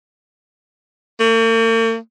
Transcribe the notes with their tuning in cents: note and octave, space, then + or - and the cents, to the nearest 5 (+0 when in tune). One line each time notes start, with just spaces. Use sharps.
A#3 -45